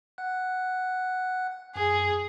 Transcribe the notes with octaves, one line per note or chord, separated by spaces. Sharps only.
F#5 F#6
F#2 G#4